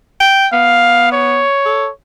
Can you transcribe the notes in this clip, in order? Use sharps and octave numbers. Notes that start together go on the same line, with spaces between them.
G5
B3 F5
C#5
A4